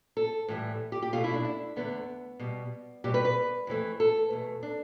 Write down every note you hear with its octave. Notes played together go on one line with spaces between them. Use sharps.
A4
A2 E3 G3
G4
G4
B2 A3 F4
E4
D4
E4
E2 D3 A3 B3
B2 G3
B2 G3 G4
B4
B4
F2 E3 A3
A4
E2 B2 A3
D4